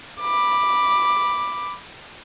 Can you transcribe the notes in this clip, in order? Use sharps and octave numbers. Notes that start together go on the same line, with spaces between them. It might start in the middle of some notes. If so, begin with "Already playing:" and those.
B5 D6